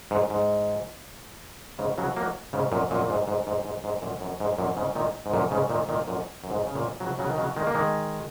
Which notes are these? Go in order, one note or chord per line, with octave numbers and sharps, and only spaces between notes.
G#2
G#2
G#2 C#3
C#3 F#3
F#3 A#3
G#2 C#3
F#2 A#2
F#2 A#2
A#2
G#2
G#2
G#2
G#2
G#2
F#2 A#2
F#2
G#2
F#2 A#2
G#2 C#3
A#2 D#3
G#2
F#2 A#2
G#2 C#3
A#2 D#3
A#2 D#3
F#2 A#2
F#2
G#2
C#3
F#2 A#2
C#3 F#3
C#3 F#3
D#3
C#3 F#3
D#3 G#3
A#3
D#3 G#3